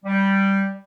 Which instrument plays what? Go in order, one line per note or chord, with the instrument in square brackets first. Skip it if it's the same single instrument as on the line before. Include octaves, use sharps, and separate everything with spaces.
[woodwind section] G3